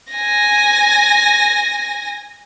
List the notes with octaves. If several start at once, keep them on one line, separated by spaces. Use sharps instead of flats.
G#5 A#6